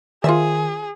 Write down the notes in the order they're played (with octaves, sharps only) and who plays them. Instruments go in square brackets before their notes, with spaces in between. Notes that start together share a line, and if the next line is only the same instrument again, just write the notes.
[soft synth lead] D#3 [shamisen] F4 C5 E5 [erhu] G#4